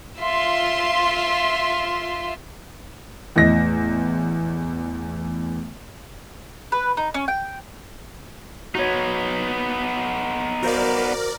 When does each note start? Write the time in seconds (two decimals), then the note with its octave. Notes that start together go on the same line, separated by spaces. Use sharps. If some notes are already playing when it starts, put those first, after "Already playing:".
0.19 F4 E5 C6
3.36 E2 A2 D#5 A#6
6.72 B4
6.97 D#4
7.14 C#4
7.28 G5
8.75 B3 D#4 F#4 C#5
10.63 F#4 A#4 C5 D5 F5